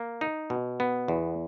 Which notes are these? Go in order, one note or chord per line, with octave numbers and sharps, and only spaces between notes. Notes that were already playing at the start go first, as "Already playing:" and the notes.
Already playing: A#3
D#4
B2
B3
E2